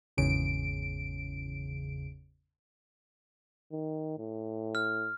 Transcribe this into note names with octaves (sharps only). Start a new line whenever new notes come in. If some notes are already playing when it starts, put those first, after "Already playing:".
G#1 E2 C#3 D7
D#3
A2
F6